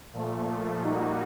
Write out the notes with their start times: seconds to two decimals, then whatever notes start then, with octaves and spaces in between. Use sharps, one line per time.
0.13 A#2 F3 A3
0.80 A#2 G3 A#3 D#4 F#4